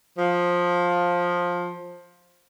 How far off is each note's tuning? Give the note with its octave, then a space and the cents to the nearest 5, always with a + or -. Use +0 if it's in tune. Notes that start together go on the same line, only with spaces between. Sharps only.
F3 +15